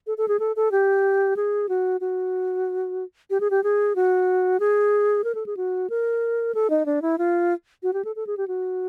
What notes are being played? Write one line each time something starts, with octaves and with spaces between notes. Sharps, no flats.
A4
A4
G#4
A4
A4
G4
G#4
F#4
F#4
G4
G#4
G4
G#4
F#4
G#4
A#4
A4
G#4
F#4
A#4
A4
D#4
D4
E4
F4
F#4
G4
A4
A4
G#4
G4
F#4